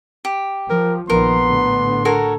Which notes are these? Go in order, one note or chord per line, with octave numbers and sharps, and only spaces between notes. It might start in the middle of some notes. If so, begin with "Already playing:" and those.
G4
F3 A#4
A#1 D#3 F3 B3 A#4 C6
A2 D3
F#4 A4 A#4 C#5